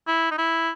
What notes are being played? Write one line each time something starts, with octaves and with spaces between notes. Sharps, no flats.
E4
D#4
E4